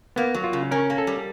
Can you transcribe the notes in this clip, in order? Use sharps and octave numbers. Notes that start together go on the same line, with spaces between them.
A#3 B3
F#3
F4
C#3
C#4 A#4
A#3
A4
G3